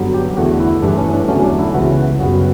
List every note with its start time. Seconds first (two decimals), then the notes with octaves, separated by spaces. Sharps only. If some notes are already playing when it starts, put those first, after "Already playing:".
Already playing: G2 D3 F#3 B3
0.14 G4
0.37 E2 D3 A3 F#4
0.60 E4
0.82 G2 E3 A3 D4
0.98 C#4
1.13 D4
1.28 E2 D3 F#3 A3 C#4
1.44 D4
1.59 E4
1.74 C#2 C#3 E3 B3 F#4
2.20 F#2 C#3 G3 B3 F#4